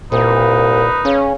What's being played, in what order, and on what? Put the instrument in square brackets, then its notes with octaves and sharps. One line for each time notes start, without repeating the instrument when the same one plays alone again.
[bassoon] C2 [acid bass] A#2 [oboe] D#4 [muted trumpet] B4
[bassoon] C#3 [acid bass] C#4